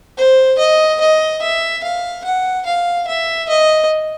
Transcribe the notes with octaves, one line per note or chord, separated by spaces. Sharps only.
C5
D#5
D#5
E5
F5
F#5
F5
E5
D#5